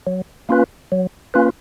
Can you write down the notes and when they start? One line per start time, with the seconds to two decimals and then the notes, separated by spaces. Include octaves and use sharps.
0.07 F#3
0.49 A#3 C#4 F4 B4
0.92 F#3
1.34 A#3 C#4 F4 B4